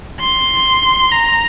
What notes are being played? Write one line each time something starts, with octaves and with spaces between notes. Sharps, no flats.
C6
A#5